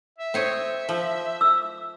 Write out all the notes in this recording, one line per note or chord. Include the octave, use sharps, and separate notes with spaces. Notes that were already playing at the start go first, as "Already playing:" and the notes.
E5
C4 C#5 D#5
F3
E6